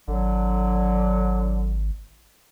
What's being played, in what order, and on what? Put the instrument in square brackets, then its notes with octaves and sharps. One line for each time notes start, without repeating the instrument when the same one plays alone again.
[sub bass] G#1 [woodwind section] D3 F#3